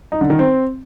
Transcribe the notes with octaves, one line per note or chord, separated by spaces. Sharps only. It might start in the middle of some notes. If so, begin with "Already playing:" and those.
D#4
D3
D#3
C4